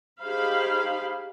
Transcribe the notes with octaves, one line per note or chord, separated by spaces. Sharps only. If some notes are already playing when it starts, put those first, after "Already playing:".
D#4 G4 G#4 C5 F5 B5